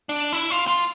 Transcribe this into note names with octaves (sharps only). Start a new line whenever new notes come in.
D4
E4
F4
F4